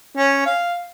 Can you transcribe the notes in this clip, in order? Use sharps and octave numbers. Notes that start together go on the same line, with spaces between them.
C#4
F5